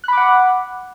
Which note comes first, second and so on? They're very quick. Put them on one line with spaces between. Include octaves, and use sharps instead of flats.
F#6 B5 D6 F#5